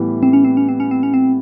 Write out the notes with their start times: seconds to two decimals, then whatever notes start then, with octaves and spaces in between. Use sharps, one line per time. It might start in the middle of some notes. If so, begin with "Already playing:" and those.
Already playing: A2 E3 G3 B3
0.23 C4
0.33 C#4
0.45 C4
0.57 C#4
0.69 C4
0.80 C#4
0.91 C4
1.03 C#4
1.14 C4